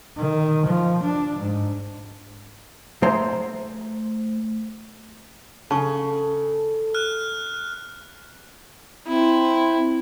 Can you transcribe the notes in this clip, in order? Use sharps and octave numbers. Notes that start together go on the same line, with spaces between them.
D#3
F3
D4
G#2
A3 C5 A#5
C#3 A4 A5 C#6
F6 F#6
C4 E4